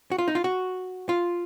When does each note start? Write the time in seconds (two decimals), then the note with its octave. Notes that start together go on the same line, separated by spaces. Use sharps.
0.12 F#4
0.18 F4
0.28 D#4
0.35 F4
0.44 F#4
1.09 F4